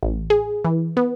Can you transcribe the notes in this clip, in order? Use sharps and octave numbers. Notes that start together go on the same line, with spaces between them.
A1
G#4
E3
B3